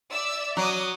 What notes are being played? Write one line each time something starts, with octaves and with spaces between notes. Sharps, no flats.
D5 E5 E6
F#3 D6 D#6